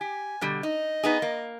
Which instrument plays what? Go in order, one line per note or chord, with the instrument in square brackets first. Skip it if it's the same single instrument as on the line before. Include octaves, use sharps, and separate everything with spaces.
[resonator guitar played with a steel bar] G4 [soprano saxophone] G#5
[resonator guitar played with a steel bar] B2 D3 G3
[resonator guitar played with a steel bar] D#4 [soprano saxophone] D#5
[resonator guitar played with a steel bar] B3 D#4 G#4
A#3